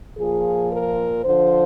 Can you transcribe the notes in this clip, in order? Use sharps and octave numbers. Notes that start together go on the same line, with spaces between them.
A#2 F3 G#4
A#4
D3 F3 C5